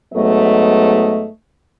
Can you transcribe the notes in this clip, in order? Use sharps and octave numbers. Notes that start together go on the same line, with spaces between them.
G#2 F#3 A3 B3 D#5